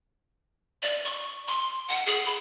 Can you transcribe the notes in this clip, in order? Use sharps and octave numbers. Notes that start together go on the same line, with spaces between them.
D5
C#6
C6
F#5
G#4
B5